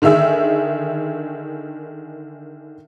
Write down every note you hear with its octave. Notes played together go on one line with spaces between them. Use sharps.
D3 D#3 G#4 E5 E6